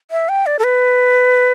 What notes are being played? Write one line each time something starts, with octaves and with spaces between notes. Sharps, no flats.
E5
G5
D5
A4
B4